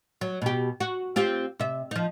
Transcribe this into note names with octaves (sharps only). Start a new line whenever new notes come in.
F#3
B2 G4
F#4
C4 F4 G4
C3 E5
F3 D#4